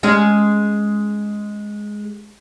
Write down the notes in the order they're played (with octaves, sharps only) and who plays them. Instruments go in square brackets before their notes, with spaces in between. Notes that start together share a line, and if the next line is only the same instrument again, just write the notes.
[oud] G#3 C#4 G#4